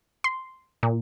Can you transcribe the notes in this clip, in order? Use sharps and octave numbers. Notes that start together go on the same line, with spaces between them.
C6
A#2